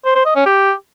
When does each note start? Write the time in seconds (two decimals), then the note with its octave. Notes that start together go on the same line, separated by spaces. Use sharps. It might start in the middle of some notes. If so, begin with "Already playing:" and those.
0.05 C5
0.15 C5
0.25 D#5
0.36 C#4
0.46 G4